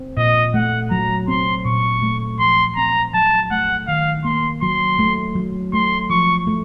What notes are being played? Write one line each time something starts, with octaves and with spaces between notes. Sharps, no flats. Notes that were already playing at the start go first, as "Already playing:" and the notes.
Already playing: C4
A#2 D#5
A3 F#5
F#3 A#5
C4 C6
A#2 C#6
A3
F3 C6
C4 A#5
F#3 A5
A3 F#5
D#3 F5
A#3 C6
F#3 C6
A3
F#3
A3 C6
F3 C#6
A3